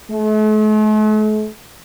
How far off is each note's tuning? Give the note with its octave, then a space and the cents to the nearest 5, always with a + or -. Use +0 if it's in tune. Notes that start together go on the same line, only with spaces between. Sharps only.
A3 -45